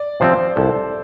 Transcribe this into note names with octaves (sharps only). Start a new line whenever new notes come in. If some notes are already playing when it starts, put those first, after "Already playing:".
Already playing: D5
C3 F3 C4 C5
C2 A4